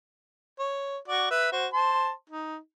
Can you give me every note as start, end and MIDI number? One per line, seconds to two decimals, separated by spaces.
0.59 0.97 73
1.08 1.30 66
1.08 1.30 74
1.31 1.52 71
1.31 1.52 76
1.52 1.67 66
1.52 1.67 72
1.73 2.11 72
1.73 2.11 81
1.73 2.11 84
2.30 2.57 63